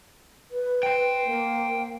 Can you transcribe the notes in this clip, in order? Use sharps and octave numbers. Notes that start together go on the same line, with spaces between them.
B4
C5 G5
A#3